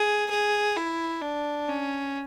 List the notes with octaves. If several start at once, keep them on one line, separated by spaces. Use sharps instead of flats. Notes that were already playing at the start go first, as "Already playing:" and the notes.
Already playing: G#4
G#4
E4
D4
C#4